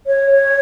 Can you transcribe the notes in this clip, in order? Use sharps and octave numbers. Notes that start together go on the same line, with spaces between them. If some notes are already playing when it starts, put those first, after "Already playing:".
C#5